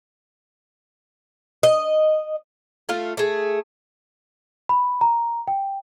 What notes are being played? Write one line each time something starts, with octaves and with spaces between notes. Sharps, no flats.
D#5
A3 F4 F5
A3 G#4
B5
A#5
G5